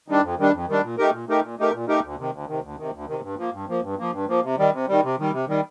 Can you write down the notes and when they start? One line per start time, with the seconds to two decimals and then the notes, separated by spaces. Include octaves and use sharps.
0.08 D#3 G3 D4
0.23 F2
0.39 D#3 G3 D4
0.54 F2
0.68 D#3 G3 D4
0.83 A#2
0.98 A3 D#4 G4 A#4
1.13 A#2
1.29 A3 D#4 G4 A#4
1.43 A#2
1.59 A3 D#4 G4 A#4
1.73 A#2
1.88 A3 D#4 G4 A#4
2.04 D2
2.18 C3 D#3
2.33 D2
2.48 C3 D#3
2.64 D2
2.79 C3 D#3
2.93 D2
3.08 C3 D#3
3.23 G2
3.38 F3 A#3
3.53 G2
3.69 F3 A#3
3.83 G2
3.99 F3 A#3
4.13 G2
4.29 F3 A#3
4.44 C3
4.58 D#3 G3
4.74 C3
4.88 D#3 G3
5.04 C3
5.19 D#3 G3
5.33 C3
5.48 D#3 G3